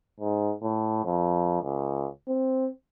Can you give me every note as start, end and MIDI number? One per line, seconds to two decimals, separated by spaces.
0.20 0.53 44
0.62 1.00 45
1.05 1.60 41
1.62 2.07 37
2.28 2.69 60